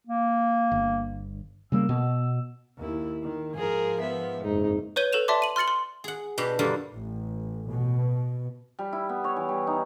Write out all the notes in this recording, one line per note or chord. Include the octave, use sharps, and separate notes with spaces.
A#3
G1
C#3 G3 A#3 E6
B2
D#2 E4
D#3
G#2 F3 G#4 A#4
B3 E5
F#1 F2 G#2 D#4
B4 C#5 G6 D#7 G7
A4 B4 E7 F7
D5 E5 A5 C6 D6
D#7 F#7
C6 F6 A6 C#7 F#7
C6
G#4 F#5
B2 D4 G4
G2 D3 G3 A#3 F4
A1
B2
G3
E4
B3
C#5
E3
G3
D#4